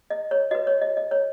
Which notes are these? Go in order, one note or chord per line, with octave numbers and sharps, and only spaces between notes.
D#5
C#5
F#4 B4 D#5
C#5
D#5
D#5
C#5